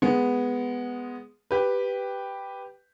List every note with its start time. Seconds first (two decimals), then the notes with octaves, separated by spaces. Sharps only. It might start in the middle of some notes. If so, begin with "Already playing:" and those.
0.02 G#3 B3
1.51 G4 B4